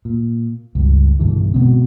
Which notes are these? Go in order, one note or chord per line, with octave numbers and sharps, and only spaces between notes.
A#2
C#2 G2
B1 G2 D3 E3
B2 G#3 B3 C4